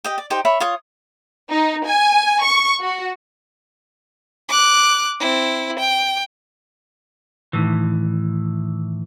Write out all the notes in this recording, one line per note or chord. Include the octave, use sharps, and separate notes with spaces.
G4 D#5 G5
D5
D#4 G4 C5 G5
C#5 E5 B5
F4 C#5 D#6
D#4
G#5
C#6
F#4
D6 F#6
C4 E4
G5
A2 D#3 E3